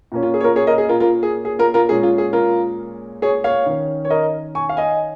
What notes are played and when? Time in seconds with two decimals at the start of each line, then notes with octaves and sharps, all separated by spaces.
0.12 A#2 A#3 C#4
0.23 F4
0.34 G#4
0.41 C#5
0.44 F4 A#4
0.56 G#4 C#5
0.67 A#4 D#5
0.78 G#4
0.89 F4 A#4
1.00 F4 A#4
1.23 G#4
1.45 G#4
1.59 F4 A#4
1.74 F4 A#4
1.89 A#2 G#3 C#4 G#4
2.03 F4
2.18 G#4
2.33 F4 A#4
3.22 G#4 C#5
3.44 C#5 F5
3.66 D#3 C#4
4.05 C#5
4.10 A#4 D#5
4.55 G#5 C#6
4.69 F5
4.77 D#5 G#5